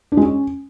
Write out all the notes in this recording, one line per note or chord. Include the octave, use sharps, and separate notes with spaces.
D4
G#3
C#4